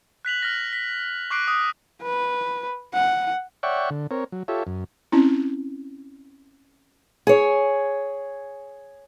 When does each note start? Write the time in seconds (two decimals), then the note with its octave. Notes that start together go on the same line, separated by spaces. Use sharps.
0.25 F#6 B6 F7 F#7
0.43 F6 A#6
0.73 B6
1.31 C#6 D6 F#6 C7 D7
1.48 D#6
2.02 B4
2.93 F#5
3.63 C#5 D5 E5 F#5 G5 C#6
3.90 D3
4.11 C4 A#4 C#5
4.32 F#3
4.48 F4 G4 A4 C#5 E5
4.67 F#2
5.12 C4 C#4 E4
7.27 G#4 C#5